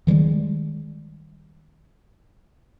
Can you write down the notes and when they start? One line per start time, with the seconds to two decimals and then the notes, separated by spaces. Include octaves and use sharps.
0.07 D#3 E3 G3 G#3